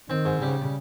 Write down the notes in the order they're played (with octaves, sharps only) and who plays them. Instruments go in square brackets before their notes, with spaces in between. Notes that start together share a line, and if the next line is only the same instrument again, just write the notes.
[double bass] D#3 [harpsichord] C4
[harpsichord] G#2
[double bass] C#3 [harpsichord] G3